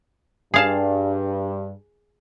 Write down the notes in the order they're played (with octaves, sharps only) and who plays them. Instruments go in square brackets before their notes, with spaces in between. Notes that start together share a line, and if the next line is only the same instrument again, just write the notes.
[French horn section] G2 [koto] G#4 F5 A5